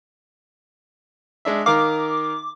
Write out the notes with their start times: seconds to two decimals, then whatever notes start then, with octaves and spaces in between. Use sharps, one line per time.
1.45 G#3 D4 E5
1.66 D#3 A#4 F5 D6